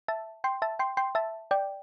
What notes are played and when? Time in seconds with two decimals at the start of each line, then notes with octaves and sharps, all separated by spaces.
0.08 E5 A5
0.44 G5 C6
0.62 E5 A5
0.79 G5 C6
0.97 G5 C6
1.15 E5 A5
1.51 D5 G5